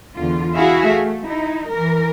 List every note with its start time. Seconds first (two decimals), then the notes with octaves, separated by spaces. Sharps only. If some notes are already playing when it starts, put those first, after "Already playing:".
0.14 E2 D3 F4
0.54 E4 F#4 G#4 E5 F5
0.88 A3
1.22 D#4 E4
1.69 E3 A#4